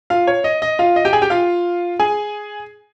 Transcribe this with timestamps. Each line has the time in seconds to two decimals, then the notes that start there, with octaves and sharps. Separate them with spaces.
0.10 F4 F5
0.27 C#5
0.44 D#5
0.62 D#5
0.79 F4 F5
0.96 D#5
1.05 G4 G5
1.13 G#4 G#5
1.22 G4 G5
1.30 F4 F5
2.00 G#4 G#5